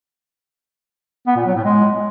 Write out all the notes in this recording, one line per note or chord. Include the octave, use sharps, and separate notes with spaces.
B3
A#2
F#3
A2
G#3